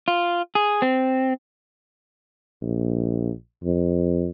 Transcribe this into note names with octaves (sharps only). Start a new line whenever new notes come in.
F4
G#4
C4
A#1
F2